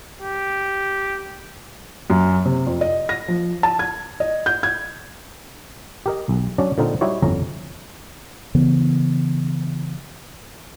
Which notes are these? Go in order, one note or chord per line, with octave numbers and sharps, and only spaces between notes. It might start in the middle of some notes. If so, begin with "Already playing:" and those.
G4
F#2
C3
F2
D#5
A#6
F3
A5
G#6
D#5
G6
G#6
G4 A#4 D#5
B1
F#3 C#4 D4 D5
A#2 D3 C4 D#4 A#4
G3 D#4 E4 F#4 G4 C#5
G1 F2 C#4 A#5
C#3 E3 B3